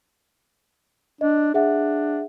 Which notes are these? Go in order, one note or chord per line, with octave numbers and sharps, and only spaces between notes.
D4 D#5
D4 G#4 E5 F#5